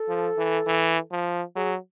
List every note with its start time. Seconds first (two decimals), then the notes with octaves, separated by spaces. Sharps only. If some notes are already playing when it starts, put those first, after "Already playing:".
Already playing: A4
0.09 F3
0.38 E3
0.67 E3
1.11 F3
1.56 F#3 G#4